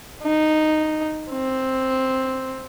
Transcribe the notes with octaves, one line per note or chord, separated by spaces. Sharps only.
D#4
C4